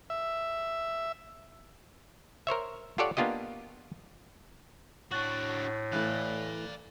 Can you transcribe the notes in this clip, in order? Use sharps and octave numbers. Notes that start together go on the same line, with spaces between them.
E5
A#4 C5 C#5 E5
F4 G4 A4 C#5 D5 F#5
A#3 B3 D4 F4 G4 D#5
A2 D4 F#4 C#6 F#6 A6
E3 A3 E4 D5 F5 F#6